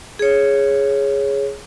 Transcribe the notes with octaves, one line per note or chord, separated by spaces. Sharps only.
G#4 C#5